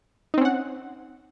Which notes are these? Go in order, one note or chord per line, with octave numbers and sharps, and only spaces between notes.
C4 C#4 D#4 F#5